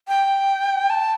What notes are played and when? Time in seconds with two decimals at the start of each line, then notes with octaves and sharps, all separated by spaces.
0.08 G5
0.90 A5